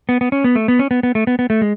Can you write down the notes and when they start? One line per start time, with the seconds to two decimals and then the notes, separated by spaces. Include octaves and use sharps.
0.09 B3
0.21 B3
0.32 C#4
0.44 B3
0.55 A3
0.68 B3
0.79 C#4
0.91 B3
1.03 B3
1.15 A3
1.27 B3
1.39 B3
1.50 A3
1.61 G#3